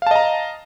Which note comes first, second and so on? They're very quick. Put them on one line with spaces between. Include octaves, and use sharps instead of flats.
F5 A5 D#5 A#5